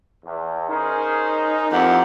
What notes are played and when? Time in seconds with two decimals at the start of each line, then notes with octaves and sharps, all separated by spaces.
0.24 E2
0.70 C#4 D#4 G#4 A#4 C5
1.71 F2 A#3 E4 G4 F#5